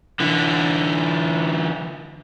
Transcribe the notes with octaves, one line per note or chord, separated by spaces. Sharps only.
D3 E3